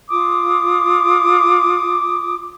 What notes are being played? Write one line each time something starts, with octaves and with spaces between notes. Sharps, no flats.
F4 D6 D#6